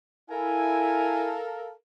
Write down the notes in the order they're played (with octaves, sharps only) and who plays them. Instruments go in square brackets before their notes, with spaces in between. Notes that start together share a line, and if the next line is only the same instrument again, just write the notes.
[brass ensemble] E4 [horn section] A4 A#4 F5 [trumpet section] G#5